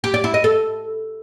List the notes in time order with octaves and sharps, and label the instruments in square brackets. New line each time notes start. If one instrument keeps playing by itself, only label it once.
[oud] G4
D5
E4
D#5
A4